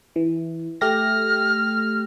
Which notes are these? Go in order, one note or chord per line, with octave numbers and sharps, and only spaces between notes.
E3
A3 G4 F6 A#6